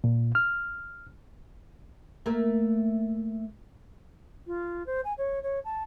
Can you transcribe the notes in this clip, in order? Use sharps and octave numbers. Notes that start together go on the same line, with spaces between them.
A#2
F6
A3 A#3
F4
C5
G#5
C#5
C#5
A5